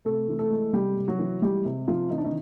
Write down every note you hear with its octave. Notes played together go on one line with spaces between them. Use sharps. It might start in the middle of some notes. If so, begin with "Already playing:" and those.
C3 A3 A4
E3
A3 A4
G#3
C3 G3 G4
C3
F#3 F#4
E3
G3 G#3 G4
C3
C3 F3 F4
E3 D#4
D4
D#3 D#4